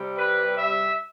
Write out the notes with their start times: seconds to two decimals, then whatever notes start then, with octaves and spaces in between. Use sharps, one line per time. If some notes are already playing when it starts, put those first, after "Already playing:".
Already playing: C3 G3
0.18 B4
0.58 E5